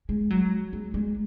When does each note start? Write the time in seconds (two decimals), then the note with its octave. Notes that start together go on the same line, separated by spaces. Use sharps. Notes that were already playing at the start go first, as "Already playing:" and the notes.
0.09 G#3
0.30 F#3
0.73 G#3
0.94 G#3